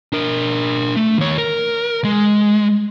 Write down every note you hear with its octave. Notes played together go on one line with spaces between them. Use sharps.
D4 A#4
A3
D#2 C#5
A#4
G#3